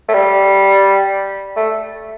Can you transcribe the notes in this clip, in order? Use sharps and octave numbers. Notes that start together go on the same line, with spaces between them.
A3
G3
A3